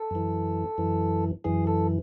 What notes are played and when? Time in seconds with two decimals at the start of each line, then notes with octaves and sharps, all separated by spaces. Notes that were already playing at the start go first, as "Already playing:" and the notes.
Already playing: A4
0.11 F#2 E3
0.78 F#2 E3
1.44 F#2 E3 G#4
1.67 A4